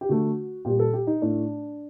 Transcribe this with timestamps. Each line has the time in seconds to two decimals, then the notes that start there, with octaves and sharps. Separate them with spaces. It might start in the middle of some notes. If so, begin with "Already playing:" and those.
0.01 G4
0.09 D3 A3 F#4
0.65 A#2 G4
0.70 G3
0.79 A4
0.93 G4
1.07 D#4
1.22 A2 A3 D4